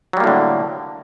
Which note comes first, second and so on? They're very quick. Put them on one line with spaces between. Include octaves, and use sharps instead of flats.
F#3 G3 A#3 A2 D3